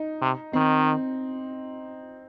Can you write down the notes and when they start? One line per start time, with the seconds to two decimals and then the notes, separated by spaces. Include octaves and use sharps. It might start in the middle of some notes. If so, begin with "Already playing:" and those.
Already playing: D#4
0.22 C3
0.53 D#3 C4